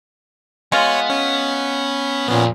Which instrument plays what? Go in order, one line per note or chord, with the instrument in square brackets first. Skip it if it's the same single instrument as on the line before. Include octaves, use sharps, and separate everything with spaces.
[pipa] G#3 F4 [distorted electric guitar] B3 [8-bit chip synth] C#5
[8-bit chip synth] C#4
[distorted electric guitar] F2 [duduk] A#2 [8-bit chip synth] B3 C#4